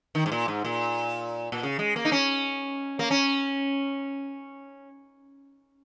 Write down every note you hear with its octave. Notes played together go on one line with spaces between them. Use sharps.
D#3
G#2
A#2
G#2
A#2
A#2
C#3
G#3
A#3
D#4
C#4
A#3
C#4